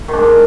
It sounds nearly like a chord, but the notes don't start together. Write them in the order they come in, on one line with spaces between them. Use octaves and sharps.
D#3 D4 G#3